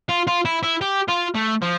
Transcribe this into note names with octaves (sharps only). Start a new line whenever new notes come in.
F4
F4
E4
E4
G4
F4
A3
F3